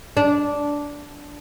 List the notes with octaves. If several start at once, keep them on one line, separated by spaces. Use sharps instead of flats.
D4